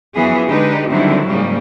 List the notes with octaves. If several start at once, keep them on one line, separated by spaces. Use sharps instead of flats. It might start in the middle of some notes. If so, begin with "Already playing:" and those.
F#2 E3 F3 B3 G#4
D3 G#3 D#4 G4 B4
D3 D#3 F#3 G3 C4 E4
G#2 C#3 G3 A#3